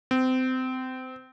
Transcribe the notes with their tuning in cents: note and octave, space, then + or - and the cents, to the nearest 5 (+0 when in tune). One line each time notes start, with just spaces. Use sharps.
C4 -25